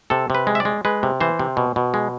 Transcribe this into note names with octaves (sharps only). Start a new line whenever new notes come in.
C3 A4
C3 B4
G#3
E5
D5
G#3
G#3 B4
C3
E3 C5
C3
B2
B2
G#3